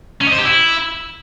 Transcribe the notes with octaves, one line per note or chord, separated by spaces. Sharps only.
C#4
D#5
C5
G4
E4